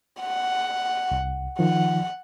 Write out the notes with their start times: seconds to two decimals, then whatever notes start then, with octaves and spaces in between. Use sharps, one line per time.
0.20 F#5
1.11 C2
1.59 D#3 F3 F#5